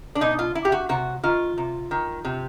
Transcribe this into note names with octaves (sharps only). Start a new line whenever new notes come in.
D4
B2 D#4
F4
E4
G4
F#4
C3 F#4
D#3 F4
C3
D#3
C3